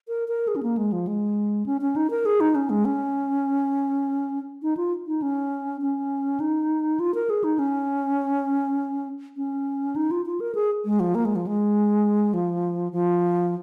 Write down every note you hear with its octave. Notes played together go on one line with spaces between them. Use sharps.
A#4
A#4
G#4
C#4
A#3
G#3
F3
G#3
C#4
C#4
D#4
A#4
G#4
D#4
C#4
G#3
C#4
D#4
F4
D#4
C#4
C#4
D#4
F4
A#4
G#4
D#4
C#4
C#4
D#4
F4
F4
A#4
G#4
G#3
F3
A#3
G#3
F3
G#3
F3
F3